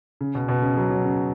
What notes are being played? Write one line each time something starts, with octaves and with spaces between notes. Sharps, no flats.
C#3
B2
B2
C#3
F#3
F#3
C#3